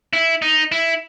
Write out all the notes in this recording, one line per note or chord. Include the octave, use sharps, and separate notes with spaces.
E4
D#4
E4